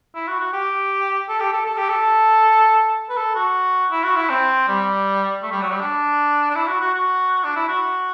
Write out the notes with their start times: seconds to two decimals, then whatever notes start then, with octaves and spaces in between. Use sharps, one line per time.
0.15 E4
0.28 F#4
0.40 F#4
0.53 G4
1.29 A4
1.40 G4
1.53 A4
1.66 A4
1.78 G4
1.89 A4
3.10 B4
3.17 A4
3.35 F#4
3.92 E4
4.04 F#4
4.17 E4
4.30 C4
4.68 G3
5.43 A3
5.52 G3
5.62 F#3
5.71 G3
5.81 D4
6.50 D4
6.55 E4
6.68 F#4
6.81 F#4
6.94 F#4
7.44 D4
7.56 E4
7.68 F#4